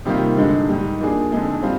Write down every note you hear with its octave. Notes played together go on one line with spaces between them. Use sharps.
C3 D#3 G3 A#3 F4
G2 D3 G#3 D#4
G#2 D#3 G3
F3 A#3 D4 G#4
F2 D3 G#3 D#4 G#4
G3 C4 F4